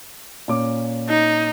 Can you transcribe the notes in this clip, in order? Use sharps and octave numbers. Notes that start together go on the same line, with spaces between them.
A#2 C#4 D6
D#4